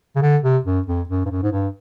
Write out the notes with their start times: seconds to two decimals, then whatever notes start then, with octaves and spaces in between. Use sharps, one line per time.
0.16 C#3
0.22 D3
0.43 C3
0.65 F#2
0.87 F2
1.09 F#2
1.25 G2
1.31 F#2
1.43 G#2
1.52 G2